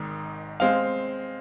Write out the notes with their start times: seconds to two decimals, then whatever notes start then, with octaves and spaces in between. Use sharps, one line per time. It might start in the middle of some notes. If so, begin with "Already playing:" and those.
Already playing: G#1 G#2 D#3
0.60 G#3 C4 F5